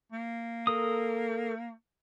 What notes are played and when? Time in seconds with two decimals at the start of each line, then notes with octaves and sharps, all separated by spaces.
0.12 A#3
0.67 A4 A#4 D#6